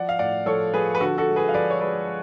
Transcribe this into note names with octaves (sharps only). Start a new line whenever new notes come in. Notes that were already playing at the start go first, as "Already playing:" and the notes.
Already playing: F3 D5 F#5
F5
A2 D5 F#5
F3 A4 C#5
F3 G#4 B4
B4
D3 F#4 A4
F#4 A4
G#3
G#4 B4
F5
F3 B4 D5
C#5
G#3 B4 D5